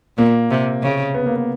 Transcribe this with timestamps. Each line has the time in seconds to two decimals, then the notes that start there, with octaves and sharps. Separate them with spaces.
0.18 A#2 A#3
0.51 C3
0.83 C#3
1.14 B3
1.26 A#3
1.36 B3